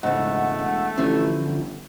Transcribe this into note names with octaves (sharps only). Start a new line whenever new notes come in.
E1 G#2 C#3 A3 F#5
A1 D3 E3 F3 C#4
G1